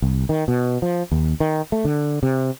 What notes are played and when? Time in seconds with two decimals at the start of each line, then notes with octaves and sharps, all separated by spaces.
0.02 C2
0.29 D#3
0.48 B2
0.82 F3
1.12 D#2
1.40 D#3
1.72 A3
1.85 D3
2.23 C3